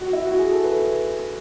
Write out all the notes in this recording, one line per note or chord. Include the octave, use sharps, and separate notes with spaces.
F#4
E4
F#4
G#4
A4
B4